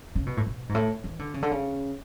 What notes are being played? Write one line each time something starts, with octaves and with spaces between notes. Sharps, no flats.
C#3
B2
A2
B2
G#2
A2
E3
D3
C#3
D3
C#3